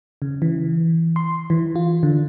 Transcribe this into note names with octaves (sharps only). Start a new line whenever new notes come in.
C#3
E3
C6
E3
F4
D3